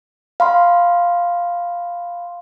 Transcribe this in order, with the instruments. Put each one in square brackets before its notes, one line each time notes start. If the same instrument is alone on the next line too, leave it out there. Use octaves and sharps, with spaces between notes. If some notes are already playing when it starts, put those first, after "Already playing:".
[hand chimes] F5 B5 C6